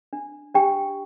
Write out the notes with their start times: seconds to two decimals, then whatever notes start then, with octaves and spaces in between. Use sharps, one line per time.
0.13 D4
0.54 D4 G4 G5